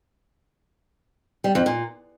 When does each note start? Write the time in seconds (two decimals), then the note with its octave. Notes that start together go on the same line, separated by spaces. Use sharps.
1.44 G3
1.55 F2
1.66 A#2